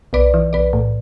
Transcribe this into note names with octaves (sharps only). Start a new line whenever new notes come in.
B1 B4 D5
E3
B1 B4 D5
A2